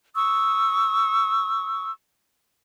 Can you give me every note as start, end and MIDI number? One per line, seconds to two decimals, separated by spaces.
0.15 1.91 85
0.15 1.91 87
0.15 1.91 88